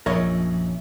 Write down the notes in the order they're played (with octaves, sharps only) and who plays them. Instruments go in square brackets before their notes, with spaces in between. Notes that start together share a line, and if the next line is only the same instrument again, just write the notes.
[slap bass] A#1 F#2 [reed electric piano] F3 E5 [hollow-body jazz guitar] A#4 C#5 D#5